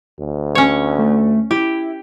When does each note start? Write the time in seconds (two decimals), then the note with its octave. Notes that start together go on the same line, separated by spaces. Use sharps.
0.20 D2
0.55 C#4 C#5
0.99 A3
1.51 E4 G4